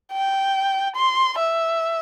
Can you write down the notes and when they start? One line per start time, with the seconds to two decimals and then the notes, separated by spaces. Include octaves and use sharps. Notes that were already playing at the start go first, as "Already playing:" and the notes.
0.13 G5
0.95 C6
1.38 E5